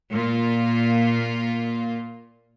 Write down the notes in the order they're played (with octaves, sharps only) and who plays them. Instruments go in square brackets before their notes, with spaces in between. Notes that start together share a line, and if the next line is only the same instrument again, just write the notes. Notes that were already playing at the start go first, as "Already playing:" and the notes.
[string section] A#2 A#3 F4